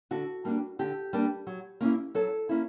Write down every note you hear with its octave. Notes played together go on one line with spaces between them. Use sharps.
D3 F#4
G3 A#3 D4
D3 G4
G3 A#3 D4
F#3
A#3 C#4 E4
F#3 A4
A#3 C#4 E4